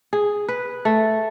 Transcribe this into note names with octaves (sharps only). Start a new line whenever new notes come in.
G#4
B4
A3